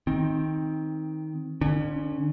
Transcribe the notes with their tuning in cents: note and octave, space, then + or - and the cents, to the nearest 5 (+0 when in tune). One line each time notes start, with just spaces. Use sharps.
D#3 +10 C4 +10
D3 +40 C#4 +0